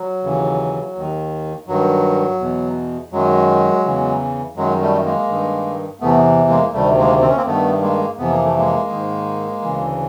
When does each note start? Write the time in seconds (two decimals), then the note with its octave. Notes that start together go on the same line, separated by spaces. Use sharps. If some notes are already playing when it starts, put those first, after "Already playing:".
Already playing: F#3
0.23 D#2 C#3 E3
0.95 D#2 D#3
1.67 G2 D#3 F#3
2.39 E2 B2
3.12 F#2 D#3 F#3 G#3
3.85 E2 C#3 E3
4.56 F#2 D#3 F#3 G#3
4.81 G3 A3
5.04 G#3 A#3
5.28 G2 D#3
6.00 E2 C3 E3 A3 B3
6.49 G#3 A#3
6.73 D2 C3 D#3 G3 A3
6.98 G#3 A#3
7.22 C4
7.28 C#4
7.36 A#3 C4
7.45 G2 D#3 A3 B3
7.81 G#3 A#3
8.17 F2 C3 E3 B3
8.30 A#3
8.44 A3
8.58 G#3 A#3
8.89 G#2 D#3
9.62 D2 C#3 E3